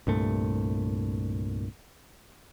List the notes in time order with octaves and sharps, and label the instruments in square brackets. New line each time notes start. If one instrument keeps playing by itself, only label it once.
[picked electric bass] C2 G2 A#2 A3